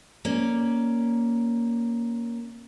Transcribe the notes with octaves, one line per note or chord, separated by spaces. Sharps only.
A#3 C#4 D5